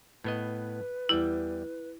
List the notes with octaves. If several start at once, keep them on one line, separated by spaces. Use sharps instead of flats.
A2 B3 B4 D#5
E2 G3 E4 G5